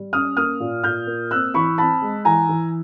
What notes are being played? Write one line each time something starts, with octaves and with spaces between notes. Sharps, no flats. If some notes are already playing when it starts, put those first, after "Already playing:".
Already playing: G3
C#4 D#6 F6
A#3 D#6 F6
A#2
A#2 F6 G6
A#3
C4 E6 F#6
E3 B5 C#6
C4 A5 B5
G#3
E3 G#5 A#5
E3